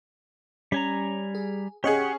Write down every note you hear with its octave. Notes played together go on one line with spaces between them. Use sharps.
G3 C#4 G#5 A#5
G#4
C#4 G4 G#4 C#5 D#5 F#5 G#5